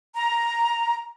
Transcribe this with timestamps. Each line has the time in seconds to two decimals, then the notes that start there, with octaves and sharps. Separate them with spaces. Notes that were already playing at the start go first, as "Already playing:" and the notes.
0.15 A#5